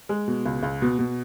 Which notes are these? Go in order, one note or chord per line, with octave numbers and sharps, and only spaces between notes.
G#3
B2
C#2
C#2
B2
B2